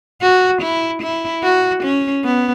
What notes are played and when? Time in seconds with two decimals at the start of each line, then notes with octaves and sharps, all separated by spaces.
0.22 F#4
0.62 E4
1.03 E4
1.43 F#4
1.83 C#4
2.24 B3